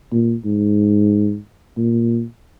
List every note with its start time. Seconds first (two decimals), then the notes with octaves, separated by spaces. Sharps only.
0.12 A#2
0.45 G#2
1.77 A#2